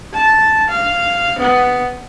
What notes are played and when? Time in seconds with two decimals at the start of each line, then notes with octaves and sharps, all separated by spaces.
0.14 A5
0.69 F5
1.39 B3